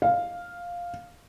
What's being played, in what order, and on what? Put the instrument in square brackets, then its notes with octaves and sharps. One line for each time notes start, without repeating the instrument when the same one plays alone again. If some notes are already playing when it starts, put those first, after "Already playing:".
[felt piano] F5